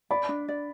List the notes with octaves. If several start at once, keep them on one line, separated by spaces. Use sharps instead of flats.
D5 B5
D4
D5